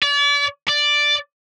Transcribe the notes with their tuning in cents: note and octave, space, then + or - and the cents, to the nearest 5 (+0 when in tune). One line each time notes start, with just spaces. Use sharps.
D5 -40
D5 +0